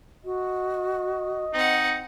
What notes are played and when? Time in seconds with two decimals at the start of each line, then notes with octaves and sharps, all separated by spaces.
0.25 F#4 D#5
1.54 C4 D#4 F#5